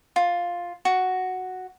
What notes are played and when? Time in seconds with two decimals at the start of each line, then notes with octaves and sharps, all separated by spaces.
0.16 F4
0.85 F#4